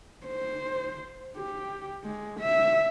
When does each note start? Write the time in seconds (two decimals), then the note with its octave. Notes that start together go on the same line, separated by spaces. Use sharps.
0.26 C5
1.37 G4
2.04 G#3
2.40 E5